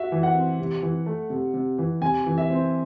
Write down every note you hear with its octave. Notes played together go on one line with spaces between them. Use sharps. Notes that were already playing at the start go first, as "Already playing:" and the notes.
Already playing: F#4 E5
E3
F#5
C4
C3
E3
A3
C3
C3
E3
C3 G#5
E3
E5
C4